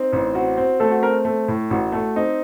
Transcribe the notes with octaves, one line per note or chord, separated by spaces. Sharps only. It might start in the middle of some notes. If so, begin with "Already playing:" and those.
Already playing: C4 D#4
A1
C4 F#4
C4
A3 A4
F#4
C4 A#4
A3
A2
A1 F#4
A3
C4 D#4